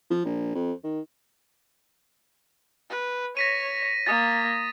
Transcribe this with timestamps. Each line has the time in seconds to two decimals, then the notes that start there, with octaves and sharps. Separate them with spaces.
0.10 F3
0.25 A#1
0.55 F2
0.84 D#3
2.90 B4
3.37 C#5 A#6 B6 D#7
4.06 A#3 D#6 A6